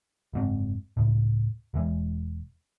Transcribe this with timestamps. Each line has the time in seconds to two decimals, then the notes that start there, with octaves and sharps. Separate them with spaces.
0.33 F#1 G#2 C4
0.97 C#2 A2
1.74 E1 E3 G#3